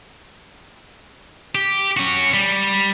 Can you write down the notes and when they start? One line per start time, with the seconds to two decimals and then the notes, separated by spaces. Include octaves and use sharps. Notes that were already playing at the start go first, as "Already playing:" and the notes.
1.55 G4
1.97 C#4 F#4
2.34 G3